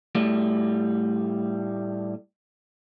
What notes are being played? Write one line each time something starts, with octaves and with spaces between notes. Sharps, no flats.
A2 G3 A3